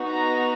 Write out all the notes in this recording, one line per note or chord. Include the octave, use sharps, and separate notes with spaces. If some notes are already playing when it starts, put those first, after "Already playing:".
Already playing: B3 D#4 F#4
A#5